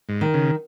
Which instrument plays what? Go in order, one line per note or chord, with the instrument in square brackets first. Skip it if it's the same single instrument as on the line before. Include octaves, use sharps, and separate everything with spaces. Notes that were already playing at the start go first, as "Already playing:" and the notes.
[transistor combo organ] G#2
[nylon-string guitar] D#3
[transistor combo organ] C#3